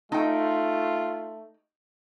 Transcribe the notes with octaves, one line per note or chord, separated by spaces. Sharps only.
A3 D#4 F4 G5